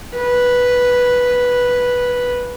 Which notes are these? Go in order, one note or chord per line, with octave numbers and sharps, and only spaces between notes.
B4